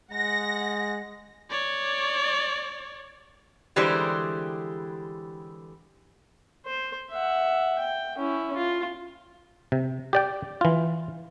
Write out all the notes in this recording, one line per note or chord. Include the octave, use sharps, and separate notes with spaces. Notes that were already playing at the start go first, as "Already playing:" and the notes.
G#3 F#5 A#6
C#5 D5
D3 E3 G3 G#3 G4 C5
C5
E5 F#5
G5
C#4 E4
F4
C3
G4 D5 G5
E3 F4